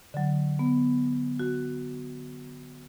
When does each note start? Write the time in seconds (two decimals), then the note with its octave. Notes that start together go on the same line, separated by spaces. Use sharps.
0.14 D3 F#3
0.59 B3
1.39 F#4